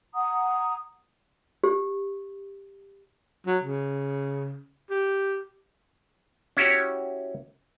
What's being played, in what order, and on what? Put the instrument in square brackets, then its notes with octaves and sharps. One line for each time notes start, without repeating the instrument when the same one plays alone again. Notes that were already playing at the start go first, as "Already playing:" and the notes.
[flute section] F#5 A#5 D#6
[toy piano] G4
[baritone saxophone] F#3
C#3
G4
[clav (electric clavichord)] C#4 E4 F#4 G4 C#5